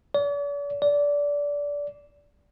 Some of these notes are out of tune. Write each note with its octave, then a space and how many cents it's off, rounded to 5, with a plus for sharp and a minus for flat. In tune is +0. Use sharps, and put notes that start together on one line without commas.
D5 -45
D5 -20